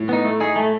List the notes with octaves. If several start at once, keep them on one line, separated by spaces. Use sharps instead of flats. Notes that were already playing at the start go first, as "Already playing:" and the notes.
Already playing: A2
B3 D#4
A3
D#4 G#4
A3